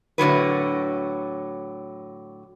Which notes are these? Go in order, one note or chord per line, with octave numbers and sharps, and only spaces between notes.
A2 D3 F#3 B4